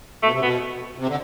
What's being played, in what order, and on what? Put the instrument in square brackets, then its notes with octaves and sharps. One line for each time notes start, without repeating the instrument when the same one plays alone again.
[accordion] B2 [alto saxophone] A3
[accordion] C3
[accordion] B2 [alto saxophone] B3
[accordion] C3
D3